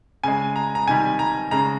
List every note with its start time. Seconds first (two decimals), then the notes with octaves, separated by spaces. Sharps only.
0.24 C#3 G#3 G#5
0.56 A#5
0.75 A#5
0.88 C3 D#3 G3 G#5
1.19 A#5
1.51 C#3 G#3 A#5